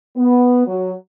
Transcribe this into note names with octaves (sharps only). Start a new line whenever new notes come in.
B3
F#3